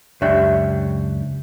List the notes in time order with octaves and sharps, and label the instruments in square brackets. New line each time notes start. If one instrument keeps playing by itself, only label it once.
[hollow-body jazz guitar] C#2 F#2 D4 G4 C#5 E5